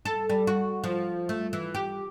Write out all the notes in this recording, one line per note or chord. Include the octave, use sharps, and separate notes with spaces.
A4
G3
F#4
F3
A3
E3
G4